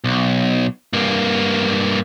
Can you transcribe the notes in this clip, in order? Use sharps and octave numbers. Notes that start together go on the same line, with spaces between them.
B1
G2 A#3